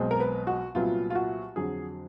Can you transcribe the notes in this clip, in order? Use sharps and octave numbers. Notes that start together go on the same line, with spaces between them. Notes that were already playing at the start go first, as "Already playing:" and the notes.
Already playing: B1 B2 G#3 C4
A#4
B4
F#4
C2 A#2 F#3 B3 F4
F4
F#4
F2 D3 F#3 G#4